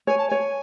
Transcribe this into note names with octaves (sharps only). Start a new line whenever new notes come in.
C#5 G#5
A5
C#5 G#5